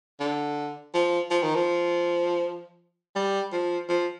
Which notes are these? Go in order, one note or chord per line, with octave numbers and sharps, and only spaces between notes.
D3
F3
F3
D#3
F3
G3
F3
F3